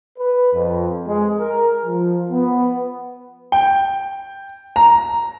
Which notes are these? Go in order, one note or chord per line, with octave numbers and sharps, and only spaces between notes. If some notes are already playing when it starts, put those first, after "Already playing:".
B4
F2
G#3
A#4
F3
B3
G5
A#5